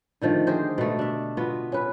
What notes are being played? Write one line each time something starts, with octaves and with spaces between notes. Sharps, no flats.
D3 D#3 F3 A3
G4 G#4 A#4 C5
B2 A3
D4 E5
B3 F4 F#4
C#4 B4